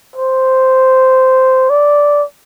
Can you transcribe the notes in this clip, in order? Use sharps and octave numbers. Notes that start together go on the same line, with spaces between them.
C5
D5